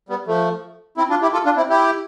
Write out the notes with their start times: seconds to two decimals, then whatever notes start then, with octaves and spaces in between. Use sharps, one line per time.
0.09 G3 B3
0.27 F3 A3
0.97 C4 E4
1.10 D4 F4
1.22 E4 G4
1.33 F4 A4
1.45 D4 F4
1.57 C4 E4
1.69 E4 G4